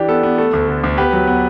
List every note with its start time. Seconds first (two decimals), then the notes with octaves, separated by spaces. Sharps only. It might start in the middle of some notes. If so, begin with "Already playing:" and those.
Already playing: E3 D4 G4
0.09 B3 A4
0.23 B3
0.38 A3 A4
0.53 D2
0.68 D3
0.84 D2
0.98 B3 G4 B4
1.13 F#3
1.27 B3